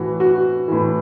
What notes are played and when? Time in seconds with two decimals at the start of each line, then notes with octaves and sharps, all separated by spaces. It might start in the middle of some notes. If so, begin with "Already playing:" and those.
Already playing: A2 E3 F#4
0.20 F#4
0.68 A2 E3